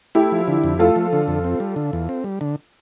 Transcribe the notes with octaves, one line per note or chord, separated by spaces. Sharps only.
A3 E4 G4
F3
D3
F2
A3 F4 A4
F3
D3
F2
C4
G3
D3
E2
C4
G3
D3